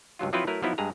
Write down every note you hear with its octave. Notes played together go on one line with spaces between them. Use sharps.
C#2 G2 F#3 F4
F3 F#3 C4 E4 F4 B4
F#3 A3 E4 A#4 B4
F3 F#3 B3 D#4 E4
G2 G#3 G#4 A#5